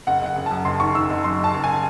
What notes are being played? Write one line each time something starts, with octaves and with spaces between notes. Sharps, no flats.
F#1 F#5
F#1 F#5
F#1
F#2 A5
F#1 C6
D#3 C#6
D#3 E6
F#1
F#2 C6
F#1 A5
F#1
G#5